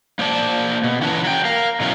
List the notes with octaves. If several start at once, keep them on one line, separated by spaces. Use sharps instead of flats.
A#3 C5 D5 A5
B2
E3 C#4 B4 A5
F#3 G5
A#4 F5
B2 F#3 C#4 E4 F5